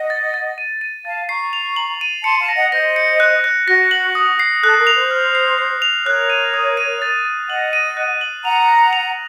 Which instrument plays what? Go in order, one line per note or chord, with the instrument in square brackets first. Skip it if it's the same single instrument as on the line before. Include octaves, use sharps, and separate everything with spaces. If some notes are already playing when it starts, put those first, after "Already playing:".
Already playing: [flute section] D#5 F#5
[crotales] A6
A6
D#7
D#7
[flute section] F5 A5 [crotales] A6
[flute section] A#5 C#6 [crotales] C7
[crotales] F7
F#7
D#7
[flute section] A5 C6 [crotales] C#7
[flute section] F5 A5
[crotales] A#6
[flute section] D#5 F#5
[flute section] C5 D#5 [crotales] A#6
[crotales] C#7
F#6
F#6
[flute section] F#4 [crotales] A#6
[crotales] F#7
D#6
C7
[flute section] A4 [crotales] F#6
[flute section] A#4
[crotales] F7
[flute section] C5
[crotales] F6
C7
C7
F7
[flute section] A#4 C#5 [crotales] F#6
[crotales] D#7
D#6
D#7
A6
A6
[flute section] D#5 F#5 [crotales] F#7
[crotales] D#7
F#6
F#7
[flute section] F#5 A#5 [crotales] F7
[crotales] A#6
F7